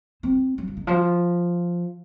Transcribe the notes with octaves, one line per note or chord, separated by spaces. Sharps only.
C4
F#3
F3
D#3
F3